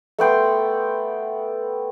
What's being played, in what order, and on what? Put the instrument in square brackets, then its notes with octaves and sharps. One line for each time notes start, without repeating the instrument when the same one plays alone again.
[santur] A3 B3 G5 C6